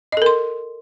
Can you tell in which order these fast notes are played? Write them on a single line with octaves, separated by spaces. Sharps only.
D#5 A4 A#4 C6